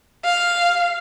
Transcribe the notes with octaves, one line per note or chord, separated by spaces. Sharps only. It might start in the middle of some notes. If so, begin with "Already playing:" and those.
F5